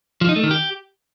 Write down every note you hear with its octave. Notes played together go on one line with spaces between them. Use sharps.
F3
D#4
A3
D#3
G4